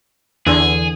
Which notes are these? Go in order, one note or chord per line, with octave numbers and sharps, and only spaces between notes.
E2 D3 G#4